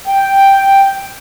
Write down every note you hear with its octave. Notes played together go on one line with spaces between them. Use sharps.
G5